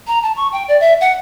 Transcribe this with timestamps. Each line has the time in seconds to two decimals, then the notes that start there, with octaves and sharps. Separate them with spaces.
0.07 A#5
0.23 A5
0.36 C#6
0.52 G5
0.68 D5
0.80 E5
1.01 F#5